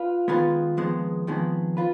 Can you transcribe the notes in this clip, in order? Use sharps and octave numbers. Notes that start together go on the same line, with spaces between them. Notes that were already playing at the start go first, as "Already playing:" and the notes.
Already playing: F4 B4
D#3 G#3 B3 F4 B4
F2 D#3 G#3 B3
F2 D#3 G#3 B3
F4 B4